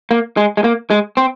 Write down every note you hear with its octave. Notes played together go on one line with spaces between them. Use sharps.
A#3
G#3
G#3
A#3
G#3
C4